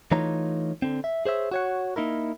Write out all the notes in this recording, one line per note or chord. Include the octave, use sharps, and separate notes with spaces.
E3 A3 D#4 F4 C#5 A#5
D3 C4
E5
G#4 C5 C#5 E5
F#4 C#5 F#5
A#3 D#4 E4 A#4